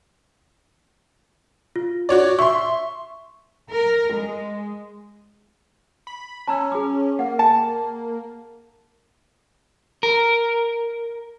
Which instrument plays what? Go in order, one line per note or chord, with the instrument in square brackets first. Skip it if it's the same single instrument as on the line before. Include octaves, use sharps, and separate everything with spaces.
[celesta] F4
[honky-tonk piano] F#4 C#5 D5
[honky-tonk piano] E5 C6 [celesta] C#6
[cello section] A#4
G#3
[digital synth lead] B5
[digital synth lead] C#4 [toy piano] A5 A#5 E6
[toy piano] G#4 D6
[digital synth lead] A#3 [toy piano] F#5
[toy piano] G5 [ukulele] A5
[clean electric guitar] A#4